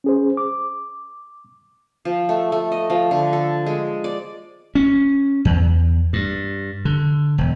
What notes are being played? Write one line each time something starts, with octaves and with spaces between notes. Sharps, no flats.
C#4 G#4 C5
D6
F3
A3
A3
D#5
F3
D3
A4
G#3
D5
C#4
E2
G2
D3
E1